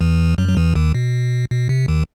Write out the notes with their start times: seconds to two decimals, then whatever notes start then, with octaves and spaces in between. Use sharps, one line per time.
0.01 E2 E3
0.38 F#2 F#3
0.48 F#3
0.57 E2 E3
0.75 D#2 D#3
0.94 B2
1.51 B2
1.69 C3
1.88 D#2 D#3